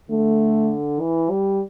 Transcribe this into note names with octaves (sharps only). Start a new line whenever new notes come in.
D3 A3
E3
G3